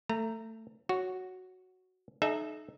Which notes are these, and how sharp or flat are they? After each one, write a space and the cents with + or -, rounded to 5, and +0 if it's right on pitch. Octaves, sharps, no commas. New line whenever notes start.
A3 +20 A#5 -15
F#4 +0 C#5 +0
D#4 -20 A4 -45 E5 +0